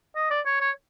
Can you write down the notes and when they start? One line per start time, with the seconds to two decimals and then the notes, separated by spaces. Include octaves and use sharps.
0.16 D#5
0.30 D5
0.46 C#5
0.60 C#5